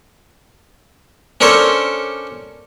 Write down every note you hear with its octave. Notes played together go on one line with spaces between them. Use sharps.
C#4 D4 A4 A#4 C5 C#5